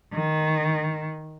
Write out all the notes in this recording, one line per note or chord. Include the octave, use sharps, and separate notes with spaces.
D#3